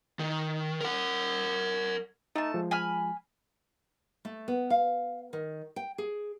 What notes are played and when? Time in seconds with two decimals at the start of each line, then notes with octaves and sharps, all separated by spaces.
0.19 D#3
0.81 A#4 F#5
2.36 A3 D#4 A5
2.54 F3 G#3
2.71 G#5 B5 F6
4.25 A3
4.48 B3
4.70 F5
5.33 D#3
5.76 G5
5.98 G#4